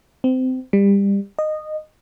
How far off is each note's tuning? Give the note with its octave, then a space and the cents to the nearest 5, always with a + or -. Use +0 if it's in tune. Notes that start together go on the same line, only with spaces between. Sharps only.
C4 -25
G3 +25
D#5 -15